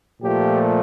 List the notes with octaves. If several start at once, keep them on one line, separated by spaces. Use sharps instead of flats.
A#2 F3 A3 G4